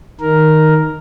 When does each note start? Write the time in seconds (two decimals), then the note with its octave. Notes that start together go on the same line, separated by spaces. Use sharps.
0.20 D#3 A#4